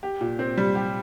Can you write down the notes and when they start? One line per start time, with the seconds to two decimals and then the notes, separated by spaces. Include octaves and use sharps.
0.03 G4
0.21 A#2
0.39 C4
0.57 G3
0.75 G4